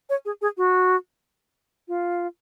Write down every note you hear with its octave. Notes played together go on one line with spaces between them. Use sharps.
C#5
G#4
G#4
F#4
F4